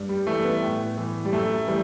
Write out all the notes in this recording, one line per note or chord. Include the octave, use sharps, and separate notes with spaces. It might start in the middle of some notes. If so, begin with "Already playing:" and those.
Already playing: G2
G3
E3 A3
B3
A2
E3
G3
F#2 A3
E3 G3